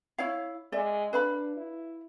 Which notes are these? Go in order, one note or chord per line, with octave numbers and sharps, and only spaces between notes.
E4 C#5 F5
G#3 D5 E5
D4 B4 F5 B5
E4